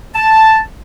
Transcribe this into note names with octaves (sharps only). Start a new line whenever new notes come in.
A5